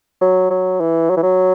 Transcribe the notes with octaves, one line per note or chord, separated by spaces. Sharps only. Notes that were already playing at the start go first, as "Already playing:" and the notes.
F#3
F#3
E3
F#3
E3
F#3